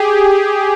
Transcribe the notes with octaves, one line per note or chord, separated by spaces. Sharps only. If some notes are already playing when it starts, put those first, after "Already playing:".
Already playing: G4 G#4